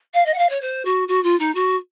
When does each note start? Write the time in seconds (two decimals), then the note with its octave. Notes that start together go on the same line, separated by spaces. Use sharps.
0.14 F5
0.25 D#5
0.33 F#5
0.38 F5
0.49 C#5
0.61 C5
0.85 F#4
1.08 F#4
1.23 F4
1.39 D#4
1.55 F#4